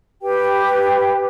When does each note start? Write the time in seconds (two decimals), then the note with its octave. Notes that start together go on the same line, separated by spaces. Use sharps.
0.22 G4 B4 G5